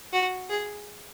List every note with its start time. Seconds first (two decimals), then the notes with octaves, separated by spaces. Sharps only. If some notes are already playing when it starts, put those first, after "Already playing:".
0.13 F#4
0.50 G#4